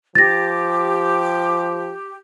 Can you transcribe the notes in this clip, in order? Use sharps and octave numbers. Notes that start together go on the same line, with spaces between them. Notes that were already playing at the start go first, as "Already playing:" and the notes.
F3 G4 A6 A#6